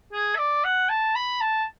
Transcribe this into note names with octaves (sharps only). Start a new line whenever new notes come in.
G#4
E5
D5
F#5
A5
B5
A5